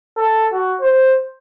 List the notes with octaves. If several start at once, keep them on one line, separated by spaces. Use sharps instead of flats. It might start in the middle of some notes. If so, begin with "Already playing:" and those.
A4
F#4
C5